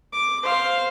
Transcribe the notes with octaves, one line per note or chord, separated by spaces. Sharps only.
D6
C5 F5